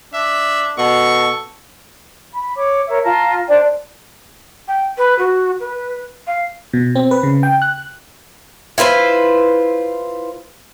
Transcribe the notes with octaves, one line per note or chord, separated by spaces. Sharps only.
D4 E5
B2 A4 C#6
B5
C#5 D6
A#4 C#5 E5
F4 A5 A#5
D4 C5 D5 G5
G5
B4
F#4
B4
F5
B2
C4
B4
C#3
G5
F#6
E4 F4 B4 C5